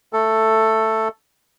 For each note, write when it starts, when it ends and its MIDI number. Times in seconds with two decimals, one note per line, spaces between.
0.13 1.08 57
0.13 1.08 69